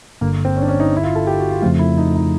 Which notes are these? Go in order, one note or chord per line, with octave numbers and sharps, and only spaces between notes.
G1 G2 D3 A#3
C4
C#4
D4
C#4
D#4
E4
F4
A4
G4
F#4
F4
F2 C#3 F3 A3 F4
E4
D#4
D#4